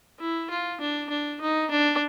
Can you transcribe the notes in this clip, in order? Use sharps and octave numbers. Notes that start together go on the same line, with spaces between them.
E4
F4
D4
D4
D#4
D4